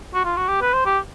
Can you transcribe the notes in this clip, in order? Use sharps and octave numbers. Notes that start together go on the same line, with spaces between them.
F#4
F4
F#4
G4
B4
C5
G4